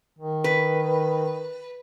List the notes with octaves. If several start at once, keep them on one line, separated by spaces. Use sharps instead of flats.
D#3
B4